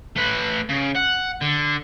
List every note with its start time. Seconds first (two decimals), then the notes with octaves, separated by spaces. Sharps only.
0.16 A3 B4
0.69 C#3
0.95 F#5
1.41 D3